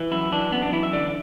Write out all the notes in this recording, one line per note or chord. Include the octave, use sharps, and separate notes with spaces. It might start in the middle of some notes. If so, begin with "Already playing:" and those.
Already playing: E3
F#2 E4
E3 D4
F#2 B3
D4
E3 E4
E5
D3 D5